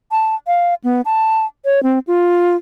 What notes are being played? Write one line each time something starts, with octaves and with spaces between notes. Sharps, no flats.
A5
F5
B3
A5
C#5
C4
F4